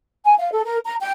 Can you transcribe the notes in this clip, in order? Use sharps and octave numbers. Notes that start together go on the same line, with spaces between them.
G#5
F5
A4
A#4
A#5
G5